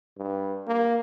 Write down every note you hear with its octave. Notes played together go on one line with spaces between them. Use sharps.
G2
A#3